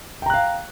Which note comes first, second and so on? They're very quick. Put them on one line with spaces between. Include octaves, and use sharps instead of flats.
G5 A#5 F#6 F5